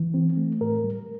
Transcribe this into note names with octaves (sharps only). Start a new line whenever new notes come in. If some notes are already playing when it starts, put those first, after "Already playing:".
Already playing: E3
C4
A3
A2 A#4
G3